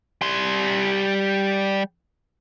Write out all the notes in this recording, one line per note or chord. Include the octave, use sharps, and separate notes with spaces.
G3 C6